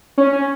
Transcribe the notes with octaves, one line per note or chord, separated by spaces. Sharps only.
C#4
C#4